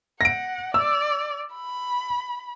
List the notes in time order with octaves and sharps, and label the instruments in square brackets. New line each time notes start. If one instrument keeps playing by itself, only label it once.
[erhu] F#5 [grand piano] A#6 D7
[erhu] D5 [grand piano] E6
[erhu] B5